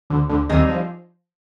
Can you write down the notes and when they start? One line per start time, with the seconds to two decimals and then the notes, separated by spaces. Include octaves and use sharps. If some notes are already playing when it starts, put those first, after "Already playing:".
0.10 D2 D3
0.29 D2 D3
0.49 D#2 D#3 G3 C4 D#4 G#4
0.69 F3